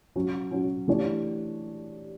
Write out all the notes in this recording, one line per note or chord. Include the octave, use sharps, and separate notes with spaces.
F#3 C#4 F#4
F#3 C#4 F#4
E3 A3 D4 G4 C#5